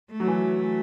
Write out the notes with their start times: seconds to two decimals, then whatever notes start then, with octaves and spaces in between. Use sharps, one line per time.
0.12 A3
0.20 F#3
0.27 E3